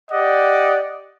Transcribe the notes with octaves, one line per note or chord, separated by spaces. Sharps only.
G4 D5 D#5 F#5